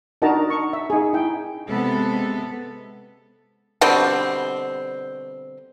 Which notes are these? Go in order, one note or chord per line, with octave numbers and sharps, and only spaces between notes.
D4 D#4 F#4 A#4 A5 A#5
C#6
E5
D#4 G#4
E4 G5
C3 G#3 B3 A4
B2 D3 G3 C4